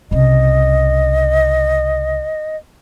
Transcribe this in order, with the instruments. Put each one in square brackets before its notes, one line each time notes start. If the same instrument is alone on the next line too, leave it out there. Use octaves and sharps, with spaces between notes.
[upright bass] C2 C#3 [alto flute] D#5